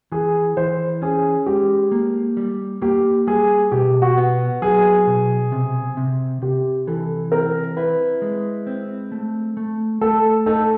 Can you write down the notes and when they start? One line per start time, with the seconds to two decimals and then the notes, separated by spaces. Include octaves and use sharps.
0.12 E3 G#4
0.57 E3 C5
1.02 C#4 G#4
1.46 G#3 G4
1.92 A#3
2.37 G3
2.82 A#3 G4
3.27 G3 G#4
3.72 B2 G4
4.02 F#4
4.17 B3
4.62 F#3 G#4
5.07 B2
5.52 C3
5.97 C3
6.42 C3 G4
6.87 E3 A4
7.32 C4 A#4
7.77 E4 B4
8.22 G#3
8.67 C4
9.12 A3
9.57 A3
10.01 A3 A4
10.46 D#4 A4